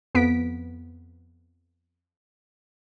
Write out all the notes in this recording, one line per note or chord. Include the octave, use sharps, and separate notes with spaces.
F2 B3 B6 D7